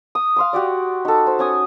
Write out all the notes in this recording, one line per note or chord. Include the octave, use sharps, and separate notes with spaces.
D#6
F5 C6 D#6
F#4 G4 D5
D#4 A4
C5
C#4 G#5 D#6